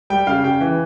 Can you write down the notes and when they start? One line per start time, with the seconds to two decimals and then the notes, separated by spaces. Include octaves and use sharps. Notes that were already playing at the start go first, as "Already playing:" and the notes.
0.10 G3 G5
0.27 C#3 F5
0.43 C#3 G5
0.61 E3